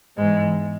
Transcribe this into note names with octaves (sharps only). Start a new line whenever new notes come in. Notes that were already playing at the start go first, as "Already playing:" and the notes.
E2 G#2 E3 G#3